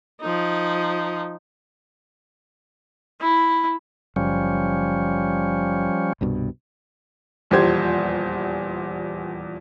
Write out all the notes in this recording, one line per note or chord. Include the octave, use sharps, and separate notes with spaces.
F3 D#4
E4
F#1 F3 G3 C#4
C2 G2 B2
D#1 E2 F3 G4 C5 G#6